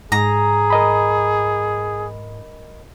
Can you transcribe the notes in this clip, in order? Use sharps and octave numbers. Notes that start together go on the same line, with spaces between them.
G#2 G#4 A#5
A#4 D#5 B5